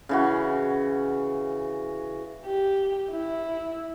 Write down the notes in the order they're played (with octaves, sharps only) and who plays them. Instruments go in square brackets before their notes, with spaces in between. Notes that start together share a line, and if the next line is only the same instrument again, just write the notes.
[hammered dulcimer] C#3 E3 F#4
[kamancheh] G4
E4